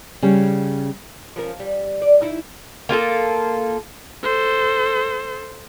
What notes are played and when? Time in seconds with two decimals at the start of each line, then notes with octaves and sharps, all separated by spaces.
0.22 C#3 G3 C#4
1.36 F3 C#4 A#4
1.60 G3
2.02 D5
2.22 D#4 E4
2.89 A#3 F4 G4 A4
4.23 A4 C5